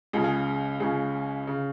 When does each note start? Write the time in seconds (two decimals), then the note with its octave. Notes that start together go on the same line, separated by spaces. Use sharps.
0.13 C#2 C#3 G#4
0.24 G#4
0.80 C#2 C#3 G#4
1.47 C#3